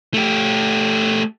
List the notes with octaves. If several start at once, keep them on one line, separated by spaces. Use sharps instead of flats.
A3 G4